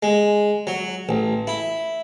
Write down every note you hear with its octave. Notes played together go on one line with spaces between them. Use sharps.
G#3
F#3
A1
E4